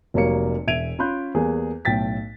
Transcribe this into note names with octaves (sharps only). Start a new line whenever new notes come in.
F1 F#3 G3 A#3 C#5 C#7
E1 E5 G#6 D7 D#7 F7
C#4 F4 B5 C6 F#6 G6
E2 G3 A#3 G#4
B1 A2 G5 A6 B6